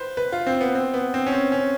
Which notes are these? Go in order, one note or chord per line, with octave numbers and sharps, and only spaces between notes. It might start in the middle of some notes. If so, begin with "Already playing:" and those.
Already playing: B4 C5
B4
F4
C4
B3
C4
B3
C4
C#4
C4
C#4